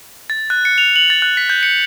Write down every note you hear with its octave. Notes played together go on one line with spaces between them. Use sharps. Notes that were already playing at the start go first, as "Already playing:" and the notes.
A6
F#6
C#7
F7
F#7
A6
F#6
B6
G6
C#7